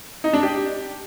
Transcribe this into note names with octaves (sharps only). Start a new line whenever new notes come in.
D#4
D4
G4